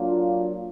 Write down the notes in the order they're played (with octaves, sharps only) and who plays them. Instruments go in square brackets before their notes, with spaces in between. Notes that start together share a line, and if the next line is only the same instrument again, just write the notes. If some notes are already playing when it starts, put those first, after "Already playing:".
Already playing: [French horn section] F#3 A#3 D4 F4